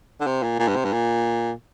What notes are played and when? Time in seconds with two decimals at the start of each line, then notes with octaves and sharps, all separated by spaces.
0.21 D3
0.27 C3
0.43 A#2
0.59 A#2
0.68 G2
0.76 C3
0.84 G2
0.93 A#2